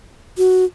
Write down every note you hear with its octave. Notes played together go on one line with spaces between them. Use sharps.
F#4